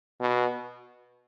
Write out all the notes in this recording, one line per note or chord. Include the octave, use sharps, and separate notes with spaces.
B2